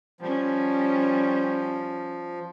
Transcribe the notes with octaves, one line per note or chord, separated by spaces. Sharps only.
F3 G3 C#4